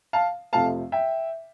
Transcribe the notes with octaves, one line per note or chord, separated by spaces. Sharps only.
F5 A5
F2 C3 F3 A3 C4 F5 A5
E5 G5